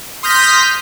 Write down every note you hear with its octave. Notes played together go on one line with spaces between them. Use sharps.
C6 D#6 F6 G6 A#6 B6